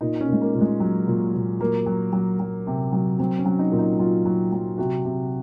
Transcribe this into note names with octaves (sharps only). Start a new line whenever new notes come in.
A#2 D#4
C#4
A#2 G#3
A#3
A#2
G#3
F#3
A#2
A#2
F#3 A#3
F#3
F#3
F#3
C3
F#3
F#3 C4
C#4
F#3
D#4
A#2
D#4
F#3 F4
F#3
F#3
C3 F#4
C3